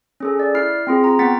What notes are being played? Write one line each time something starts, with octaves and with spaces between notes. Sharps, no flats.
C#4 G#4 A4
D5
E4 F6 C7
C4 F4 G#4
F4 A#5
B3 F#5 G5 A6 B6